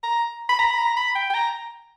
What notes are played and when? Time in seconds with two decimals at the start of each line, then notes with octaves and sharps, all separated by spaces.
0.04 A#5
0.49 B5
0.59 A#5
0.71 B5
0.79 A#5
0.97 B5
1.15 G5
1.30 G5
1.34 A#5